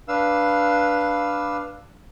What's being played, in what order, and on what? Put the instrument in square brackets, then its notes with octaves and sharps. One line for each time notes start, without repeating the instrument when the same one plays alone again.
[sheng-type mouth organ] D4 B4 F5 E6